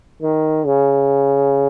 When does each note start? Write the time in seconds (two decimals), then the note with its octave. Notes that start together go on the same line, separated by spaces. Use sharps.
0.22 D#3
0.66 C#3